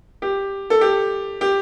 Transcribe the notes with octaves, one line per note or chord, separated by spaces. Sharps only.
G4
A4
G4
G4